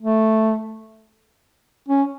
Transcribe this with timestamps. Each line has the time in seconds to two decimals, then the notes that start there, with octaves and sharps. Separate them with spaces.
0.01 A3
1.88 C#4